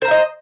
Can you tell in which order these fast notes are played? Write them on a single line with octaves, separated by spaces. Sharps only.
C5 A#5 F5 D#5